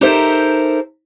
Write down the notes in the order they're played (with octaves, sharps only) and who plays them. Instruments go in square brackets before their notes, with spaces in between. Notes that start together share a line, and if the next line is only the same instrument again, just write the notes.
[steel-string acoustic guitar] D#4 G4 A4 A#4 C5 E5